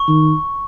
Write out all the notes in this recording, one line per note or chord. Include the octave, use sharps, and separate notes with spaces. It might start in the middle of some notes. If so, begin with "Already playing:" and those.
Already playing: C#6
D#3